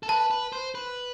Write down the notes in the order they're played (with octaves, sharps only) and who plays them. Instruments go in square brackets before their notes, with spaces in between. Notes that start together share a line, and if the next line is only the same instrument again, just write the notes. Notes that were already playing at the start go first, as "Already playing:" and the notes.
[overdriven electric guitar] A4
[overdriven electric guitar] B4 [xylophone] A5
[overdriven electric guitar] B4
C5
B4